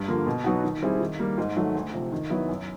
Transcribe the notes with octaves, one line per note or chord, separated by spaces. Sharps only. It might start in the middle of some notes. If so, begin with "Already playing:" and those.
Already playing: G2
D3 F3 A#3
B2
F#3 B3 D#4 F#4
D#3
G3 C4 E4 G#4
D#3
G3 A#3
G#2
D#3 F#3 A3
D2
C3 F3
D#3
F#3 B3 E4
F#2